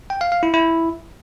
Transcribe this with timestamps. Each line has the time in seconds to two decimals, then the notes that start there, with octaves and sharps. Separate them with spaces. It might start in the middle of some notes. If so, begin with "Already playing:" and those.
0.10 G5
0.21 F5
0.32 F5
0.43 E4
0.54 E4